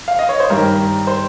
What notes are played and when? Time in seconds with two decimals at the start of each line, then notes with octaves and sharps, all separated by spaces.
0.08 F5
0.19 D#5
0.29 C#5
0.40 C5
0.50 G2 D#3 G3 A#4
1.07 C5